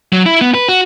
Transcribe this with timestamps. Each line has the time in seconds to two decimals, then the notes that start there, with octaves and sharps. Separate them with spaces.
0.13 F#3
0.26 E4
0.41 B3
0.54 B4
0.69 F#4